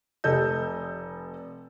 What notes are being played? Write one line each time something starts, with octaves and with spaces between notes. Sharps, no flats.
F1 C3 A4 D#5 G6